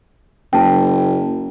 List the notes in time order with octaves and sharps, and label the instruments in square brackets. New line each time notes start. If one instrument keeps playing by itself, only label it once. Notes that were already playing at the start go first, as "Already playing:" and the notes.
[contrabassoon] F#1 [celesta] G5 A5